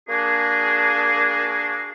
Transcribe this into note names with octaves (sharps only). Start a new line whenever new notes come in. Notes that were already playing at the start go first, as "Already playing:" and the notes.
A#3 D4 F#4 G#4